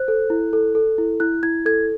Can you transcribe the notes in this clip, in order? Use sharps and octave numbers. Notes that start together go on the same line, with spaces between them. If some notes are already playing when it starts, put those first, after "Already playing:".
Already playing: C5 F#6
A4
E4
A4
A4
E4
E4 F#6
E4 G#6
A4 G#6